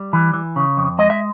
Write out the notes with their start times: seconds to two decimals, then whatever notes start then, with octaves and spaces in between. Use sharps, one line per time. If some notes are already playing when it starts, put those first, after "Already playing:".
Already playing: G3
0.13 E3
0.34 E3
0.56 C#3
0.77 F2
0.99 G#3 D#5
1.10 E5